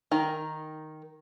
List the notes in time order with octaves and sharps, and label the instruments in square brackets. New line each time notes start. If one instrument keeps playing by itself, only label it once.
[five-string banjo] D#3 A#4